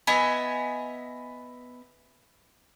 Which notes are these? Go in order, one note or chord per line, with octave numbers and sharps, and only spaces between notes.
B3 D#5 E5 G#5